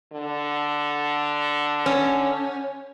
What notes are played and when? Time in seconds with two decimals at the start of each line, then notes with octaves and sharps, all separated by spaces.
0.13 D3
1.86 C#4